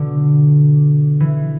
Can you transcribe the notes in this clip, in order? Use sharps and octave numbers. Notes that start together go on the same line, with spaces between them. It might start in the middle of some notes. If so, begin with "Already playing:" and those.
Already playing: B2 D3
E3